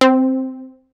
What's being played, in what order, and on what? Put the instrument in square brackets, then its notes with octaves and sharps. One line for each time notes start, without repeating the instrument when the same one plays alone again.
[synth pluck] C4